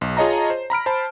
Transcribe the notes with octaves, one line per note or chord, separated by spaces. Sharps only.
B1
F4 G#4 C#5 D#5 A5 A#5
C5
A#5 B5 F6 D7
C5 A5 B5